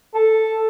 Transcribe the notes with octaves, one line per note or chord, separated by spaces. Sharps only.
A4